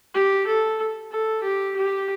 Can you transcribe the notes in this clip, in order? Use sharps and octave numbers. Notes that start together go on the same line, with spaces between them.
G4
A4
A4
G4
G4